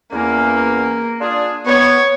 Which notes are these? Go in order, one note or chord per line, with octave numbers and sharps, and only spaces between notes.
E2 A#3 C#4
D4 F4 G#4
B3 C#5